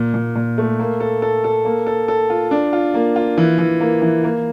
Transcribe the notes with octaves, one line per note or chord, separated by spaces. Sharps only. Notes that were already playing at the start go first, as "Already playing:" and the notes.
Already playing: A#2
A#2
A#2
A3
A#3
A4
A4
A4
A#3
A4
A4
F4
D4
F4
A#3
F4
E3
E3
A#3
E3
A#3